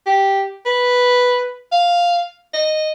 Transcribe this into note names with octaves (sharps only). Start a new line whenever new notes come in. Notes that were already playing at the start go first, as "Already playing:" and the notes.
G4
B4
F5
D#5